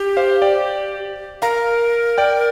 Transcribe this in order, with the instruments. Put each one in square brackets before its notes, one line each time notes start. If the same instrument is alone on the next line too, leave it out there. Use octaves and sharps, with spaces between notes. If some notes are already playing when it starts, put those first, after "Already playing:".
Already playing: [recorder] G4
[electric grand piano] C5 F5
D5 G5
[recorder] A#4 [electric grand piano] F5 A#5
[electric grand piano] D5 G5